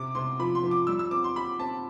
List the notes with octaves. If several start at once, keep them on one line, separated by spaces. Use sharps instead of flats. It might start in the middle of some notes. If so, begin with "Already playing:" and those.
Already playing: C3 D6
C3 C6
F3 B5
C6
F3
D6
G3 E6
E6
C4 D6
C6
G4 B5
C4 A5